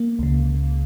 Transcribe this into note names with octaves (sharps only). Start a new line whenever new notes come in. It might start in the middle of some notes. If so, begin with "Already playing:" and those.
Already playing: A#3
C#2 C#3